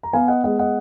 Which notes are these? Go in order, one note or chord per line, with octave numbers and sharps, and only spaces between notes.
A#5
B3 F5 G#5
D#5 F#5
G#3 D#5 F#5
D#5 F#5